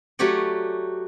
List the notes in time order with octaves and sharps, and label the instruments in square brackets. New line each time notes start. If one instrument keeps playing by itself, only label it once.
[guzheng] F#3 A3 F#4 G4 C#5 D5